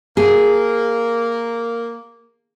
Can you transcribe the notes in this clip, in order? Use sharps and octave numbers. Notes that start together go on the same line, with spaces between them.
A#3 G#4